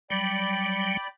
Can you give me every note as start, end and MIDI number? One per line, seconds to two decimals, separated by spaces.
0.10 0.97 54
0.10 0.97 55
0.10 1.07 74
0.10 1.07 79
0.10 1.07 83